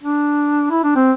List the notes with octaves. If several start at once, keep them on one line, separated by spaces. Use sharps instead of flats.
D4
E4
D4
C4